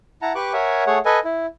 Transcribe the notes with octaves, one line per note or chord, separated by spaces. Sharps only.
E4 F#5 A5 A#5
G4 B4 C#6 D6 F#6
A#4 C#5 E5 F#5 G#5
A3 G#4 C#5 F#5
A4 B4 D#5 G#5
E4